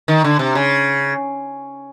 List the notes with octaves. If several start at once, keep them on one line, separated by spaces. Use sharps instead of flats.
D#3
D3
C3
C#3